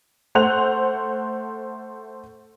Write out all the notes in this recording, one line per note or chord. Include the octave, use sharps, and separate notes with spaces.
A3 C5 F#5 F#6 F7